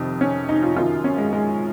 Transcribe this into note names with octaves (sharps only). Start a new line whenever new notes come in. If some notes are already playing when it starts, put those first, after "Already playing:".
Already playing: F2 C3 D#3
C#4
D#4
F4
F#2 D#3 F4
C#4
G#3
G#3